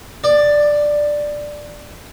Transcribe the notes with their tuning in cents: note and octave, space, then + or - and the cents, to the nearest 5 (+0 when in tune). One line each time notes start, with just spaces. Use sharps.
D5 +5